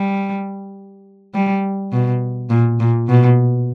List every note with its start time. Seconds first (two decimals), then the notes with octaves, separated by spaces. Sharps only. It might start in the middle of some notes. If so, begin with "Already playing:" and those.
Already playing: G3
1.34 G3
1.93 B2
2.50 A#2
2.80 A#2
3.08 B2